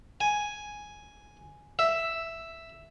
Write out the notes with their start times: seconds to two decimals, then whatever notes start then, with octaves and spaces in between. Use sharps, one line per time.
0.21 G#5
1.79 E5